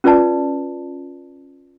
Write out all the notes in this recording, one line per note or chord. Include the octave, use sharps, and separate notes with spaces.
C#4 F4 B4 D5 A5